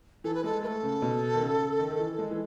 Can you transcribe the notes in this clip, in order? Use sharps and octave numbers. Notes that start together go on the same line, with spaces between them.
E3 A4
B4
G#3 A4
A3 A4 B4
C#3
B2
D#3
C#3
D#3
D#3
E3
G#3
E3